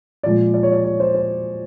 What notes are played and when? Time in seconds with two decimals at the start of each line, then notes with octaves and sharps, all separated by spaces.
0.23 A#2 F3 G#3 D5
0.54 D5
0.63 C#5
0.72 D5
0.84 C#5
1.00 C5
1.15 C5